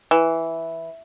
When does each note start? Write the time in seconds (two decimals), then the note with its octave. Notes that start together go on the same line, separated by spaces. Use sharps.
0.11 E3